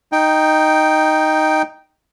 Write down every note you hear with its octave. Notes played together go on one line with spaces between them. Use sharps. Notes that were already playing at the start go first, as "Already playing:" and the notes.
D#4 G5